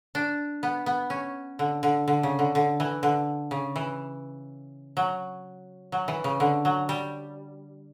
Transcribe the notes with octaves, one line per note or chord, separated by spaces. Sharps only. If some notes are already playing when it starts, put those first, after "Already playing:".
D4
B3
B3
C#4
D3
D3
D3
C#3
D3
D3
E3
D3
C#3
E3
F#3
F#3
E3
C#3
D3
F#3
G3